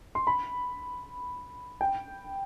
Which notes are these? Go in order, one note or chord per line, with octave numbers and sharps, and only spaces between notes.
C6
B5
G5